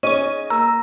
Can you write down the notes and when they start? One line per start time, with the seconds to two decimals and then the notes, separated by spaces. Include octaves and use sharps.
0.03 C#4 D#4 G#4 D#5 C#6 D#7
0.50 A#3 A#5 E6